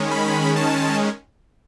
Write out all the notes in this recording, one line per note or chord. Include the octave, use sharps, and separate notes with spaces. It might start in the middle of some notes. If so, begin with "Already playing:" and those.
Already playing: D#3 G#3 C#4
B5
A5